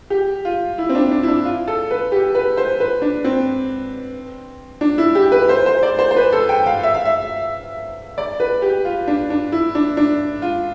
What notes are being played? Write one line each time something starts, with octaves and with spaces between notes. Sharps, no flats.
G4
F4
E4
C4
D4
D4
E4
D4
F4
A4
B4
G4
B4
C5
B4
D4
C4
D4
E4
G4
B4
C5
C5
D5
C5
C5
B4
A4
G5
F5
E5
F5
E5
D5
B4
G4
F4
D4
D4
E4
D4
D4
F4